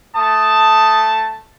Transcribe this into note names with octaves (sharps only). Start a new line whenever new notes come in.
A3 A5 D#6